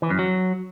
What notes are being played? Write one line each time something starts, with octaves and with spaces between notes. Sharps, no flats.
E3
F#2
F#3